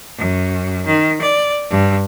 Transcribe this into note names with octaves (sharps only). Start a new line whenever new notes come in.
F#2
D#3
D5
G2